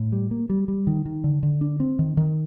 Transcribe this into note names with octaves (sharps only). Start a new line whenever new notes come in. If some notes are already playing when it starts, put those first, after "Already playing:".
Already playing: A2
G3
A#3
G3
G3
D#3
D#3
D3
D3
D4
C4
D#3
D#3